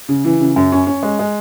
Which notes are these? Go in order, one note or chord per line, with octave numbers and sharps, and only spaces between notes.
C#3
E3
C#3
F#2
C#4
C#4
G#3
G#3